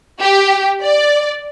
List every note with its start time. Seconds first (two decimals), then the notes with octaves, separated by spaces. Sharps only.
0.20 G4
0.84 D5